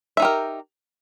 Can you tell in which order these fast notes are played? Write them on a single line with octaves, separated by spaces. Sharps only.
E5 D#4 G4 A#4